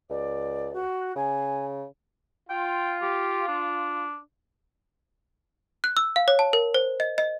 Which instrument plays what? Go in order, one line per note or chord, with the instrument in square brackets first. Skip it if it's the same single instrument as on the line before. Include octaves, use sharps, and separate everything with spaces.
[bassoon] C#2 [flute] D5
[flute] F#4
[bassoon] C#3 [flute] G#5
[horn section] F4 [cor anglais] G5
[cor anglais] G4
D4
[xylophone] F#6
E6
F5
C#5
A5
A#4
C5
D#5
D#5